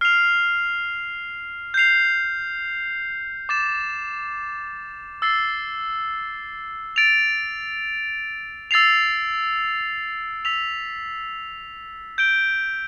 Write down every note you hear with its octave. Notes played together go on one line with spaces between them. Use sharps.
F6 C7 F7
G6 C7 F7
D6 A6 E7
E6 A6 C7 G7
A6 D7 F7
E6 A6 C7 F7
E6 B6 F7
G6 D7 G7